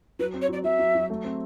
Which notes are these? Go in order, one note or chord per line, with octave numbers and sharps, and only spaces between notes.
F#3 B4
C4
C#5
F#3 D5
F#3 E5
F#3
F#3
A3
C4